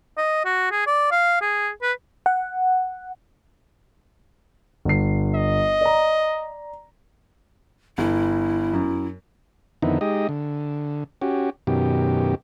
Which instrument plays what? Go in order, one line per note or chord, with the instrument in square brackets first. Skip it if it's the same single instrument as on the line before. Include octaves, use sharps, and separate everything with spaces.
[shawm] D#5
F#4
G#4
D5
F5
G#4
B4
[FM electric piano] F#5
[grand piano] G1 C7
[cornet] D#5
[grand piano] D5 A#5
[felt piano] G1 [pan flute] E4
[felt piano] F#2
[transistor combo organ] F2 D3 D#3 B3 D#4 E4
G#3 D#4 G4 D#5
D3
C#4 F#4 G4
F#2 B2 D#3 G4